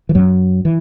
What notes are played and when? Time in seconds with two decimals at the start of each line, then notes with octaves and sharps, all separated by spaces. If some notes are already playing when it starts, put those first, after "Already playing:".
0.09 E3
0.15 F#2 F#3
0.65 E3